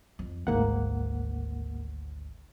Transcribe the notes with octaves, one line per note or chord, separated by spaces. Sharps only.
F2
G#1 D2 G#2 A#3 F#5